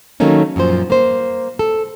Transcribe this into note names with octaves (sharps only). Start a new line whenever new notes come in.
D#3 F#3 A3 A#3 C#4 D#4
F#2 A#2 F3 C5
A#3 C5
A4